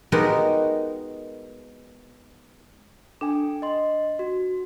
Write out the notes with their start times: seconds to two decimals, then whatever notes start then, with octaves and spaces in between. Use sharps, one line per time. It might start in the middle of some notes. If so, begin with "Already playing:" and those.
0.12 G#3 B3 D#4 F#4 G4 A#4
3.21 D4 A4 G5 G#5
3.62 D#5 C6
4.19 F#4